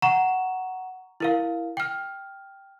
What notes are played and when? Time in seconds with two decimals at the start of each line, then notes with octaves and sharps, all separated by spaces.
0.02 F#5 A#5 C#6 E7
1.20 E4 A#4 F5
1.77 G5 F6